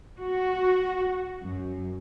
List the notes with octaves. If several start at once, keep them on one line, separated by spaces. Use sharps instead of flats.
F#4
F#2